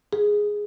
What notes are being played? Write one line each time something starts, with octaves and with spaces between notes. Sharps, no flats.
G#4